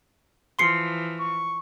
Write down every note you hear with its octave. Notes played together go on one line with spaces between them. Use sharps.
E3 F3 C6 C7 C#7
C#6